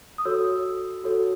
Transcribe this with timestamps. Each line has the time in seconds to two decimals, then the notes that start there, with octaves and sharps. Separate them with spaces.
0.18 D#6
0.25 F#4 A4 C#5 E6
1.04 F#4 A4 C#5